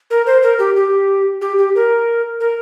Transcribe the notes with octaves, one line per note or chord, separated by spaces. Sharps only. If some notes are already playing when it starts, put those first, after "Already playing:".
A#4
C5
A#4
G4
G4
G4
G4
A#4
A#4